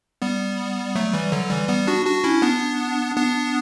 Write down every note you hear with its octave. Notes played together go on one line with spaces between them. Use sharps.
G3 B3
F#3 A3
E3 G3
D3 F#3
E3 G3
G3 B3
D4 F#4
D4 F#4
C#4 E4
B3 D4
B3 D4